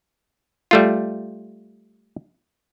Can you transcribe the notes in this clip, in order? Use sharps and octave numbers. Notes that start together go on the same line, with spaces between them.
G3 A3 F4